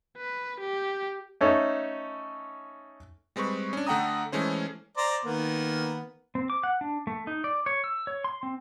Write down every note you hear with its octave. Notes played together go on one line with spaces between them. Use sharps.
B4
G4
A3 C#4 D#4 A4
G3 G#3 C4 B4 C#6
C#4 D4
D3 A3 F#5 G5 A#5 D#6
E3 G#3 A3 C#4 C5
C5 D5 A#5
D#3 A#3 B3
C4
D6
F#5
D4
A3
D#4
D5
C#5
E6
C#5
C6
C4